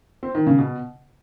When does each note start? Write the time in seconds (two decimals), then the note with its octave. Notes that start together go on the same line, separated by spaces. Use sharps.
0.23 C4
0.35 D#3
0.47 C#3
0.59 B2